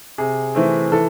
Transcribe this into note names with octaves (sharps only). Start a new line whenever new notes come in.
C3 G#4
E3 A3 C4
E3 A4